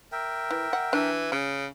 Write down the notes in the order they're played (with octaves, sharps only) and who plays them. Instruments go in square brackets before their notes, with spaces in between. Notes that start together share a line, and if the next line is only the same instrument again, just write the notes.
[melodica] A#4 E5 G5
[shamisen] E3
F#5
[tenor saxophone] E3 [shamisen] D4
[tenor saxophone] C#3 [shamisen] C#4